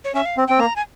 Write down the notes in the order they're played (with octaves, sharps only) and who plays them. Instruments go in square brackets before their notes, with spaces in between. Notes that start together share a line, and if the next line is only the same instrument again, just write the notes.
[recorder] C#5
[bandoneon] C#4 [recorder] E5
[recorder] F5
[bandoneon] C4
[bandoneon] C4 [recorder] G5
[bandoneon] A#3 [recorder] A#5
[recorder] G#5